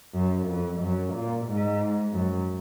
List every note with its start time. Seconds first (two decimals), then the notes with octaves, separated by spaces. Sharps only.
0.14 F#2
0.48 F2
0.80 F#2
1.14 A#2
1.47 G#2
2.13 F#2